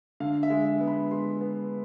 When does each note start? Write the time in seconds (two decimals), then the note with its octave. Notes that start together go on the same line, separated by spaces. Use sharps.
0.20 D3 F5
0.43 E5
0.50 G#3
0.66 E5
0.80 B3
0.88 B5
1.11 G#3 C6
1.41 B3